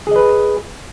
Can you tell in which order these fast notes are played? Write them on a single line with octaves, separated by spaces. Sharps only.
G#4 D#5 B4